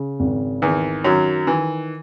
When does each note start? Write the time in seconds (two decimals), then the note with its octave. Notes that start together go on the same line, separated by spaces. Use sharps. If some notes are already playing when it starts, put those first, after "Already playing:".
Already playing: C#3
0.20 G#1
0.62 E2 D#3 E3
1.04 F#2 D#3 F#3
1.47 D#3 E3